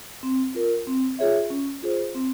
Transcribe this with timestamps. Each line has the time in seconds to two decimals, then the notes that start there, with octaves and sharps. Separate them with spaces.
0.23 C4
0.55 F4 A#4
0.87 C4
1.19 F4 G#4 C#5 E5
1.50 C#4
1.83 F4 G#4 C5
2.15 C4